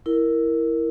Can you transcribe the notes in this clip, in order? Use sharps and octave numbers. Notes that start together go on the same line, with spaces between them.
E4 A#4